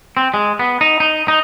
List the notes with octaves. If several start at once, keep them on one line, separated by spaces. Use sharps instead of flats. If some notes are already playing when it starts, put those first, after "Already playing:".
C4
G#3
B3
D#4
D#4
D#4